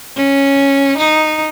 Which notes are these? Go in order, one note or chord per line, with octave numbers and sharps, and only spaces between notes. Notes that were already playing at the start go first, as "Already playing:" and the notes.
C#4
D#4